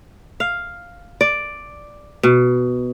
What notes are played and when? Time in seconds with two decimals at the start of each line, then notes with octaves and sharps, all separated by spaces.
0.40 F5
1.21 D5
2.23 B2